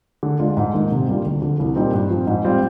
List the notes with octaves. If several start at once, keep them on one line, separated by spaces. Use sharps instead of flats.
D3
G#3 D4 F4
G#2
D#3 A#3 D#4
C3
G3 A#3 D4 F4
D2
D3 F3
C2
A#2 G3 C4 D#4
G2
F3 C4
G#2
G3 C4 F4